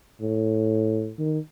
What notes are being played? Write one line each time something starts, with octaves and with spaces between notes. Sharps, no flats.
A2
D#3